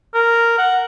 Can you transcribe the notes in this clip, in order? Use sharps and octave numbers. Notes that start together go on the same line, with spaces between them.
A#4
F#5